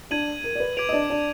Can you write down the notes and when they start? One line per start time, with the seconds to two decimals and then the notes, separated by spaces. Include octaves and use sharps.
0.11 D4 D5 G#6 D#7 F#7
0.44 A#4
0.55 D5
0.60 B4
0.77 B4 D6 G#6 D7 F7
0.89 D#5
0.93 D4 D5
1.10 D4 D5